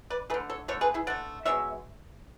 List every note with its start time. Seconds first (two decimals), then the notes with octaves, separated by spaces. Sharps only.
0.10 B4 D5
0.30 A3 G#4 B4
0.34 D3
0.50 A4 C#5
0.68 D3 A3 A4 C#5
0.81 G#4 B4
0.94 E4 G#4
1.07 D3 A3 D5 F#5
1.45 B2 G#3 B3 C#5 E5